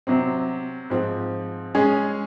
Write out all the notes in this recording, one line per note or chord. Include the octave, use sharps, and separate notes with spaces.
C3 F#3 C4
G#2 F3 C4
G#3 C#4 G#4